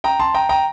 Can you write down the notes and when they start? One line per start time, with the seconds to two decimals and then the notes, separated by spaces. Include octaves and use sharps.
0.04 G5 A#5
0.20 A5 C6
0.34 G5 A#5
0.49 G5 A#5